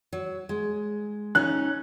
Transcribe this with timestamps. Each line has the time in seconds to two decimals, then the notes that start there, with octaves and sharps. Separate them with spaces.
0.13 F#3
0.49 G#3
1.35 C#4 D#4 F#6